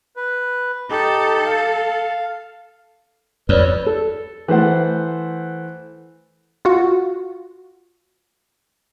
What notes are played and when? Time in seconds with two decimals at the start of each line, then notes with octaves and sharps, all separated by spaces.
0.16 B4
0.90 D#4 G4 A4
1.46 F5
3.49 F2 B4 C#5 D5
3.86 A4
4.48 E3 A3 C5 F#5
6.65 F4 F#4